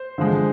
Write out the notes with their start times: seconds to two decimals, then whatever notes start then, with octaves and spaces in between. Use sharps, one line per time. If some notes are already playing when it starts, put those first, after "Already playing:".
Already playing: C5
0.18 D3 F3 G#3